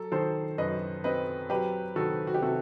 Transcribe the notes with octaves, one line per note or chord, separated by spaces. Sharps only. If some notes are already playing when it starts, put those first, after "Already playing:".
Already playing: F#3 A4
D#3 A4 C5
F#2 B4 D#5
C4 B4 D#5
F#3 G4 B4
D#3 F#4 A4
F#4
G4
C3 F#4 A4